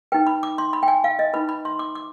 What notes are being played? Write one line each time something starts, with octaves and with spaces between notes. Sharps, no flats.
D#4 B4 G5
B5
D6
C6
B5
G5
G#5
F5
D#5
D#4 B4 B5
B5
C6
D6
D6